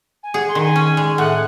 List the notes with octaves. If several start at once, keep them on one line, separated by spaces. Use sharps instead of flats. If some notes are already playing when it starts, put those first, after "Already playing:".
G#5
G#4 F#5
C6
D#3
G#5
C#4
G#3
A2 F#5